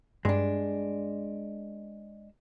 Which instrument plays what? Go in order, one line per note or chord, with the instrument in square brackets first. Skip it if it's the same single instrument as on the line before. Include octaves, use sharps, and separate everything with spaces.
[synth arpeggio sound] G2 [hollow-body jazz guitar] G#3 D4